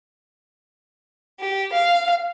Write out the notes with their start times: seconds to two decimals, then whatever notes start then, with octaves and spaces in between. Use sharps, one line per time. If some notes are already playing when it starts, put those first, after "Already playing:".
1.38 G4
1.72 F5